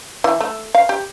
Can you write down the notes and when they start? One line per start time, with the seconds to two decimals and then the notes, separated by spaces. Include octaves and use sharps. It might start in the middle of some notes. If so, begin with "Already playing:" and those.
0.24 E3
0.40 A3
0.75 F5
0.89 G4